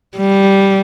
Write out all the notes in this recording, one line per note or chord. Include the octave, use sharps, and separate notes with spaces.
G3